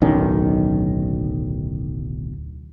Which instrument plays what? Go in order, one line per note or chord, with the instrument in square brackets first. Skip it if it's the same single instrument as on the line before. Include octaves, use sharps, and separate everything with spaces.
[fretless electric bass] D1 B1 D#3 C#4